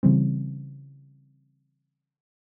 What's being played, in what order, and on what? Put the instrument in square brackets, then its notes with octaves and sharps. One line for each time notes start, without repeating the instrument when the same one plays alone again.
[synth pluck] C#3 E3 G3 C4